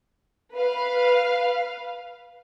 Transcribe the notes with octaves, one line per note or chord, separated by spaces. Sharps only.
B4 F5